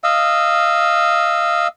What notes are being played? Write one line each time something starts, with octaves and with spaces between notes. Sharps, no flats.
D#5 F5 E6